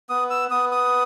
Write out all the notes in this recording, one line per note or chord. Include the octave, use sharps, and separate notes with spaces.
B3 D#6
E6
B3 D#6
D#6